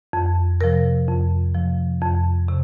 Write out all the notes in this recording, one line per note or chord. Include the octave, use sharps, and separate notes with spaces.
F2
C3 F3 A#4
F2
C3 F3
F2
C3